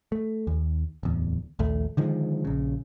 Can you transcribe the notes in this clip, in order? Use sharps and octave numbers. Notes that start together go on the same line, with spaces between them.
A3
D#2
D1 E2
A#1 D#2 A3
D3 D#3 F3 G#3
A#1 C#3